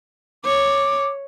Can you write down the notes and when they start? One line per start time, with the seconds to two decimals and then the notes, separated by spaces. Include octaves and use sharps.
0.45 C#5 D6